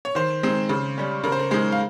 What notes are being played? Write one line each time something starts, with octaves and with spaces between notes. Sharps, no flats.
C#5
D#3 C5
G#3 C4 D#4
C#3
G3 C#4
C#3 A#4
C5
A#4
G#3 D#4 C5
F5